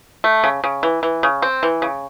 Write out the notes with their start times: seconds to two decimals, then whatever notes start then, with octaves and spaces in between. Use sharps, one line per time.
0.24 A3
0.44 C#3
0.64 C#3
0.83 E3
1.03 E3
1.23 C#3
1.42 C4
1.63 E3
1.82 C#3